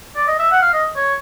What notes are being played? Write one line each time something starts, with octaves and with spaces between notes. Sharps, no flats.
D5
D#5
E5
F#5
F5
D#5
C#5